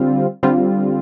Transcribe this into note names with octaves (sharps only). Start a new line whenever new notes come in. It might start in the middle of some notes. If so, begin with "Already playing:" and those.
Already playing: D3 G3 C4 F4
D3 G3 C4 F4